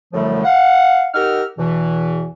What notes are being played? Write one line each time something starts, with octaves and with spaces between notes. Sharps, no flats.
F#2 A2 D3 F3 G3 A3
F5 F#5
D#4 G4 A#4 F#5 E6 F6
E2 B2 E3